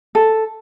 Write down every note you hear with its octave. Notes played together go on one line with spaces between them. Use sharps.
A4